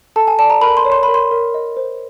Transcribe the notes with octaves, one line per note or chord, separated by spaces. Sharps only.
A4 A5
G#5
D5 A5
A#5
A#4 B5
C6
C#5
C6
B5
A#4
C6
A#4
D#5
C5